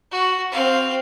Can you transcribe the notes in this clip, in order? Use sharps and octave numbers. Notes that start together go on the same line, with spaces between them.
F#4
C4 F5